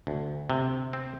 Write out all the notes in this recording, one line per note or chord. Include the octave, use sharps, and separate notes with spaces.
D2
C3
C4